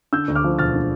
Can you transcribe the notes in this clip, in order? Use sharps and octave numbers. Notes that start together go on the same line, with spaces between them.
D3 E6 G6
D2
D6 F6
F3
E1 F6 A6
D3